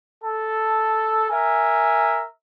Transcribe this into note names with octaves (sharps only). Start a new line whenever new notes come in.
A4
A#4 E5 G#5